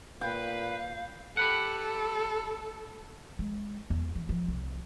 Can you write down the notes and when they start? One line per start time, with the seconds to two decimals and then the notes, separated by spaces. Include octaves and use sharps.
0.21 A#2 B4 F5 G5
1.37 G4 A4 B4 F#5
3.39 G#3
3.90 E2
4.15 E3
4.29 F3
4.48 C2